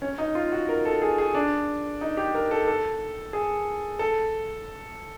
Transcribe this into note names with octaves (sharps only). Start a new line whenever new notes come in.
C#4
D#4
F4
F#4
A#4
A4
G#4
G#4
D4
D#4
G4
A#4
A4
A4
G#4
A4